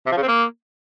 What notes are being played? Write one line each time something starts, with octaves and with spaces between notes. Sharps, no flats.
C3
F3
C#3
C4
A#3